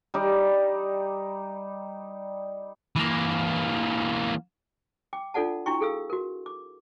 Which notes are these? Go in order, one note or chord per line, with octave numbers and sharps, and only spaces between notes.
G3 D#4 D5
E3 A#3
G5 D6
D4 F4 A4 D5 F#5 A5
D4 E4 F#4 G5 C#6
G#4 A4 F5 E6
F#4 A#4
D6